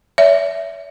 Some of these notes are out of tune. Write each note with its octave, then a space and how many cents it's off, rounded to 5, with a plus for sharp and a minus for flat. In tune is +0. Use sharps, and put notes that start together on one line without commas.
C#5 +40 E5 +0